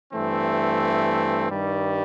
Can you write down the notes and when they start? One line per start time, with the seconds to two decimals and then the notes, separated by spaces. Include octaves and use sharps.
0.12 G2 E3 A3 C4
1.50 G2 D#3 G3